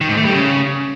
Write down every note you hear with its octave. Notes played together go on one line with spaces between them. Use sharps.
D#3
G#2
A3
G3
C#3